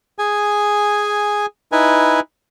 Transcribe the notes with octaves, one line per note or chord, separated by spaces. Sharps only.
G#4 G#5
D#4 E4 B4 G#5